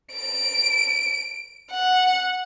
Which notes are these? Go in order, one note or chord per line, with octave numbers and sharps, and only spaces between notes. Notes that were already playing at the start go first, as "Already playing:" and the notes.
D7
F#5